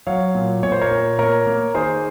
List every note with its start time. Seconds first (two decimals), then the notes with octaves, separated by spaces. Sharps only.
0.07 F#3 C#5 F5
0.35 A#2
0.63 A#2 C#5
0.72 C5
0.81 A#4 C#5
0.91 A#2
1.19 A#3 A#4 C#5
1.47 A#3
1.75 D#3 G#4 C5